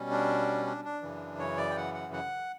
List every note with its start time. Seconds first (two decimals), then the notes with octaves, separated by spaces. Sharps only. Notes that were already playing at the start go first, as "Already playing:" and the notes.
Already playing: B2 G3 C#4
0.11 D4
0.66 D4
0.85 D4
1.02 F#2 C#3 E3
1.39 C#5
1.57 D5
1.70 G5
1.77 F#5
1.94 F#5
2.13 F#5